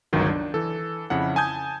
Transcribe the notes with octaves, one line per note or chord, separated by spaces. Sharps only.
G1 C#2 D#3 F#3
D4
E3 A4
F2 C#3 E4 F#5
G#5 A5 D#6 G6 G#6